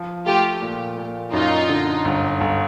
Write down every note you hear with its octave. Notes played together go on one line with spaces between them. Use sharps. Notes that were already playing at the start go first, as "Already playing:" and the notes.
Already playing: F3
A3 F4 G4
A#2
A#2
F#2 D#4 F4
D3
G1
G1